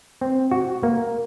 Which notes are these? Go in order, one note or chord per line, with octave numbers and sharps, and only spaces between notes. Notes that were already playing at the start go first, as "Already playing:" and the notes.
C4
F#4
A#3